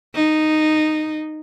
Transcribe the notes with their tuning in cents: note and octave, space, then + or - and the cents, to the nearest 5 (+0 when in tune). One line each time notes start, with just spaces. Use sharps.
D#4 -10